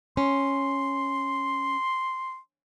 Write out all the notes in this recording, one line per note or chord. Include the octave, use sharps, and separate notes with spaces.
C#4 C6